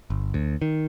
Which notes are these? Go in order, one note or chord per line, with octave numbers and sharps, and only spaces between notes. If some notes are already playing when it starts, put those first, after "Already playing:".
G1
D2
D#3